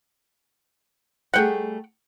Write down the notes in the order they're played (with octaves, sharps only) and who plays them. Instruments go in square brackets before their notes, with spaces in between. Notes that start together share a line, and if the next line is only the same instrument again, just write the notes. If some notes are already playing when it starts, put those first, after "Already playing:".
[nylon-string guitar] G3 A3 G#4 [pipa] F#5 G5